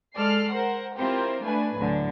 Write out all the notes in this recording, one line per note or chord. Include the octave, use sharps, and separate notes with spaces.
G#3 A4 D5 F6 C7
A#4 C5 F#5
C4 E4 F4 G4 A#4 C5
A3 D4 B4 G#5
D2 A2 D3 F#3